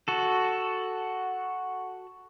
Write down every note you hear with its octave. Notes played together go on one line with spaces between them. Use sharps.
F#4 A4